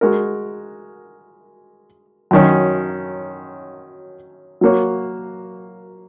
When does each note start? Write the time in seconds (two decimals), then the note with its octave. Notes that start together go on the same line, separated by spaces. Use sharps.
0.01 G#3 F#4 A#4
2.31 F#2 D#3 F#3 C#4
4.61 F#3 A#3 F#4 C#5